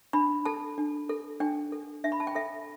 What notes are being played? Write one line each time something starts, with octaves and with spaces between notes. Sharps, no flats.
D4 B5
A4 A5
D4
A4
D4 G5
A4
D4 E5
B5
A5
G5
A4 E5